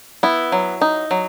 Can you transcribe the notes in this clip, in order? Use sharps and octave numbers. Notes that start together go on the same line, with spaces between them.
B3 E4
F#3
D#4
F#3